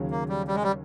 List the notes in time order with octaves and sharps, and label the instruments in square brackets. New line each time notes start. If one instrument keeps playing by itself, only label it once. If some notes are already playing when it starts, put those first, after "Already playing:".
Already playing: [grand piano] D#2 C#3 F#3
[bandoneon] A#3
G3
G3
G#3
G3